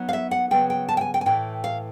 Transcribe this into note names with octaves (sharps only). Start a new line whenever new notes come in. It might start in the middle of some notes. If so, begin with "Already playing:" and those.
Already playing: F#3 B3 D#4
F5
E5
F#5
C#3 F#3 B3 G5
G5
A5
G5
G#5
G5
G#5
A2 E3 A3 G5
F5